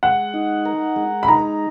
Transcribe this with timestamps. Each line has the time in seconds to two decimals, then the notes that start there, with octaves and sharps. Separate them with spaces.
0.03 G#3 F#5
0.34 D#4
0.65 A#4
0.96 G#3
1.23 B5
1.28 D#4 A#5